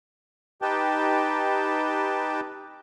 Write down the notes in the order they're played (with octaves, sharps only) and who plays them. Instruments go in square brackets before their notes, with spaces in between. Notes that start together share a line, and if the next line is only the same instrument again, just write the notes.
[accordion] D#4 G4 B4 G5 A5